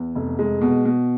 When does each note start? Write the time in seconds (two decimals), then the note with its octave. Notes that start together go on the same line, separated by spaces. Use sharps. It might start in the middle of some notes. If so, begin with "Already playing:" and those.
Already playing: E2
0.15 F1
0.39 G#3
0.61 B2
0.85 B2